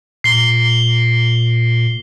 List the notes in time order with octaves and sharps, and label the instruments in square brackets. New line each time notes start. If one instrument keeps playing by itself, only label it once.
[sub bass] A#2 [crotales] C7 G7